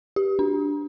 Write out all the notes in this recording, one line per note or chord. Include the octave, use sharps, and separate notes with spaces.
G4
D4